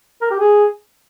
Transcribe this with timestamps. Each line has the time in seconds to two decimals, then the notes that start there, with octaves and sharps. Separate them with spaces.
0.21 A#4
0.31 G4
0.40 G#4